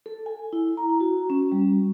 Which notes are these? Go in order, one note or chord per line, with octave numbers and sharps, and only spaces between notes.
A4
G#5
E4
A#5
F#4
C#4
G3